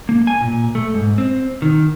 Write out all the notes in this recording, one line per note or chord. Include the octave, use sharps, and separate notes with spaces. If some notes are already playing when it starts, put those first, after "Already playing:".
A#3
G#5
A#2
A3
G#2
C4
D#3